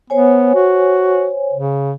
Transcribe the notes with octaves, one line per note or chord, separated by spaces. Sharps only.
B3 C5 C#5 G#5
F#4
C#3